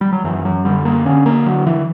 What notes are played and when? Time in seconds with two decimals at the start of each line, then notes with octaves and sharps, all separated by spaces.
0.01 G3
0.13 F#3
0.24 F#2 E3
0.45 F#3
0.65 D3 G3
0.85 A#3
1.05 D3 C#4
1.26 A#3
1.46 D3 F#3
1.66 E3